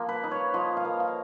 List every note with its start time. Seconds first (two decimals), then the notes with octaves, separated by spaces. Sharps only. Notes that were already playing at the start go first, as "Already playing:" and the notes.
Already playing: F3 A#3
0.09 B4
0.24 D#4
0.31 C#5
0.54 F3 D#5
0.77 F5
0.85 A#3
1.00 F5